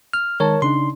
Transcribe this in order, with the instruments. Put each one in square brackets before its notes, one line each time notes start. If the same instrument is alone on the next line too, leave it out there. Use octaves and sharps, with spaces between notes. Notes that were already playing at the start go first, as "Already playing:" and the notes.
[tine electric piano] F6
[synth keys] D#3 G#3 A5 [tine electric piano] A#4 C#5
[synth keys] C#3 D4 D#4 [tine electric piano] C6